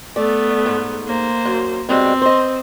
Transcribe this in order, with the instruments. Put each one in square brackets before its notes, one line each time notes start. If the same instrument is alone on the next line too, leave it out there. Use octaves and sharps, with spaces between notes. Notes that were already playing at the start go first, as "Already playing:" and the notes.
[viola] A3 B3 [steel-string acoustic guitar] D5
[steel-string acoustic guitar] G#2
[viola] A#3 C5
[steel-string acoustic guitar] F#2
[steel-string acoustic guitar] B2 G3 G#3 [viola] C4
[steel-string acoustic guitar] C5 D#5